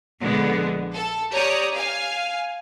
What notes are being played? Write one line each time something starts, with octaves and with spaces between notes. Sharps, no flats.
A#1 D3 G#3 B3
A4
G4 C#5 D5 A#5 D#6
F5 G#5